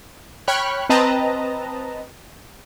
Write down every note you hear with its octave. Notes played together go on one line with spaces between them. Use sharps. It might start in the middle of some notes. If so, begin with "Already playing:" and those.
C#5 G5 B5 C#6 F6 F#6
C4 B4 D#5 A5 A#5